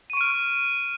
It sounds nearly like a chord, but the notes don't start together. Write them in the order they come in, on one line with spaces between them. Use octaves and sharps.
D#7 C#6 D7 F6